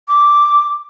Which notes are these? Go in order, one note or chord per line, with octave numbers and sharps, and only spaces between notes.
D6